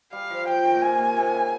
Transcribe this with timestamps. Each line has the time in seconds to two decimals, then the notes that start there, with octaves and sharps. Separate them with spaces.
0.13 G3 F5
0.30 F3
0.48 F3 G5
0.65 D#3
0.75 A#2
0.82 C3 G#5
0.99 A#2
1.17 C3
1.34 C#3